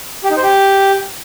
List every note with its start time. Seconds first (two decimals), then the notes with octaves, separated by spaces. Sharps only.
0.24 G4
0.30 D#4
0.37 C5
0.43 G4